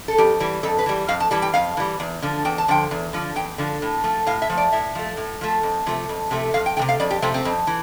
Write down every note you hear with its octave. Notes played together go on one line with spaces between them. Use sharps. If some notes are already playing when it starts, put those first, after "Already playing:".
A4
F2 G4
E3 G3
F2 A4
B4
E3 G3
F2 F5
A5
E3 G3 A5
G5
F2 F5
E3 G3
E2
D3 F3
E2 G5
A5
D3 F3 G5
E2
D3 F3
E2 G5
D3 F3
A2
F3 A3
A2 F5
E5
F3 A3
D5
A2 E5
F3 A3
A2
F3 A3
F2
C3 F3 A3
F2
C3 F3 A3
F2 F5
G5
C3 F3 A3 G5
F5
F2 D5
G4
C3 F3 A3 C4
C4
F2
E3